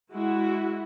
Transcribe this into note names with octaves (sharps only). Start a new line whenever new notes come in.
G#3 E4 F#4